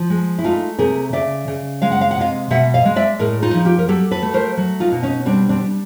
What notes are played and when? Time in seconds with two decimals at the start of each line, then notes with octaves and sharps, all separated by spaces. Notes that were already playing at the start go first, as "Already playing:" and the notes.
Already playing: F3
0.10 G#3
0.39 E4
0.44 A3 D#4 F4
0.79 C3 G#4 A#4
1.13 C#3 D5 E5
1.48 C#3
1.82 G#3 F5
1.92 F#5
2.01 F5
2.11 F#5
2.17 C3 D#5 F5
2.51 B2 E5 F#5
2.74 D#5 F5
2.85 G#3
2.96 D5 E5
3.19 A2 G#4 A#4
3.43 D#4 F4
3.54 F3
3.65 F4 G4
3.79 A#4
3.88 F#3 G4 A4
4.11 A4 B4
4.22 A3
4.34 A#4 C5
4.57 F#3
4.80 D#4 F4
4.92 B2
5.03 C#4 D#4
5.26 G3 C4 D4
5.49 C4 D4
5.60 G3